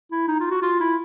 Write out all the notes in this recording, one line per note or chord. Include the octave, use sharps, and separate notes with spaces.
E4
D#4
F4
F#4
F4
E4